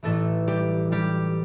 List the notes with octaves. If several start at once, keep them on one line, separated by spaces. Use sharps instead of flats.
A1 A2 E3 A3 A4
G3 G4
G3 G4